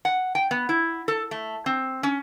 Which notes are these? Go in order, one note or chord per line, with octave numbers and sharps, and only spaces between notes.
F#5
G5
B3
E4
A4
A3
C4
C#4